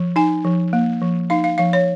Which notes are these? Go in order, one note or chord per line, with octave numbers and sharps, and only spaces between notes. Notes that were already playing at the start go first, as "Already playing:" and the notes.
Already playing: F3
D#4 G#5
F3
A#3
F3
D#4 F5
F5
F3 F5
C#5